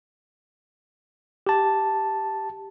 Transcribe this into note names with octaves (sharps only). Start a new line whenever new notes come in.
G4 A5